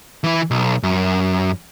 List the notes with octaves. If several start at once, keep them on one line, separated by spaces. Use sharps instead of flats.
E3 E4
B1
F#2